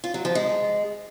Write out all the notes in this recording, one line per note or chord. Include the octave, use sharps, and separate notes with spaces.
F4
F#3
F3
G#3